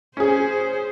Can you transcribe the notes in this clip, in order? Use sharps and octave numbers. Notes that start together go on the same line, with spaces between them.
C#4 G#4 C5